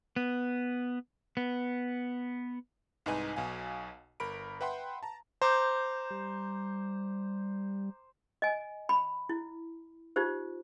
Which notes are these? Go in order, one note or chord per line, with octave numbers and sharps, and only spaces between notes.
B3
B3
C2 G#2 D#4 B4 G#5 D#7
B1 B2 F5 G#5
G1 A#4 B5 D7
B4 E5 F#5 G5 B5 C6
A5 A#5
C5 A#5 D6 G6
G3
D#5 G#5
B5
E4
D#4 F4 G4 C5